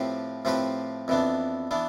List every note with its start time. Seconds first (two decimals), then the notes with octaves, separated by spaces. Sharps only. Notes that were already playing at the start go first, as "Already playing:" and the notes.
Already playing: A2 F3 C4 G4 B4
0.45 A2 F3 C4 G4 B4
1.08 F2 E3 B3 D4
1.71 E3 B3 D4